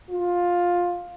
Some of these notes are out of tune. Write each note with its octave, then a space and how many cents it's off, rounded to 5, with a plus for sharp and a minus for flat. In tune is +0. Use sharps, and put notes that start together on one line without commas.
F4 +15